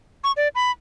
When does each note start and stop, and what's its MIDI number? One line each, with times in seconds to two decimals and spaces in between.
0.24 0.32 85
0.37 0.48 74
0.55 0.71 83